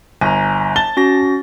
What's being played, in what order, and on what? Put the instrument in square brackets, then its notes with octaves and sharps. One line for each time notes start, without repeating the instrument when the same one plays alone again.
[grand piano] G1 [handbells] G#5 A#5
[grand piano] A5 A6 G7
[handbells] C#4 F#4 A#6